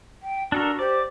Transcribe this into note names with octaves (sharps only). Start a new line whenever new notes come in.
G5
D4 F#4 A4 A#4
G4 C5 D5